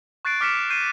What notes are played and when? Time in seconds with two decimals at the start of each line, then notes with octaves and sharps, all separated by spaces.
0.25 C#6 F#6 A6 C7 D7
0.41 D6 F6 B6 C#7 D7 E7
0.70 C#6 G6 C7 D#7